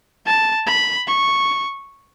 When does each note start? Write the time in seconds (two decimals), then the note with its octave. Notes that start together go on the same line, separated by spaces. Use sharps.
0.26 A5
0.67 B5
1.08 C#6